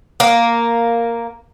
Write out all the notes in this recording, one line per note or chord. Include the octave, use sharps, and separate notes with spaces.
A#3